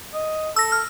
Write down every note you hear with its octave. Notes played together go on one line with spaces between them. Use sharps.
D#5
A4 E6 A#6
F6